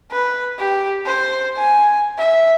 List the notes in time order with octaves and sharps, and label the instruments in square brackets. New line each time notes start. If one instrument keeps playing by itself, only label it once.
[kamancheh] B4
G4
C5
G#5
E5